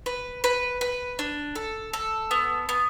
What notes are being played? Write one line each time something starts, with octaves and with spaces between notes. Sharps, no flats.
B4
B4
B4
D4
A4
A4
B3
B3